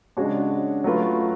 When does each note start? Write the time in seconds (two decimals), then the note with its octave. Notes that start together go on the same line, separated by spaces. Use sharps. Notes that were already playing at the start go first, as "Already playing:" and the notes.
0.17 C#3 G#3 D4 F#4 C#5
0.84 F#3 A3 F4 B4